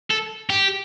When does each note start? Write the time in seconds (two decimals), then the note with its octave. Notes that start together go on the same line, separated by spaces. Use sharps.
0.10 A4
0.50 G4